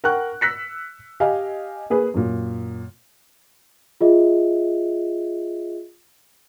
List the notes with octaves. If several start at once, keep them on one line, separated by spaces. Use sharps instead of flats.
A#4 F#5 G5 C#6 F#6
E6 F#6 B6 C#7
G4 D#5 F5 G#5
A#3 G#4 B4
F#2 A#2
F4 G#4 D#5 E5